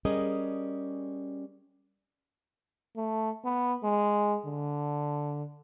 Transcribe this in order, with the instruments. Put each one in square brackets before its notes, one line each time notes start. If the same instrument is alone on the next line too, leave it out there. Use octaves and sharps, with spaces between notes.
[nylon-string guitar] G3 C#4 G#4 A#4 D#5
[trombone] A3
B3
G#3
D3